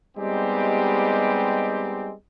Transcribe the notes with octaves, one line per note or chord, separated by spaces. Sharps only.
G3 G#3 B3 C4 D#4 G4